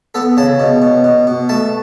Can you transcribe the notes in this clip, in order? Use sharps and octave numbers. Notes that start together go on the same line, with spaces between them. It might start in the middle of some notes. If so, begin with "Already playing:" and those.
B3 A4
C#3 A5
B2
B2
B2
B2
A3 A5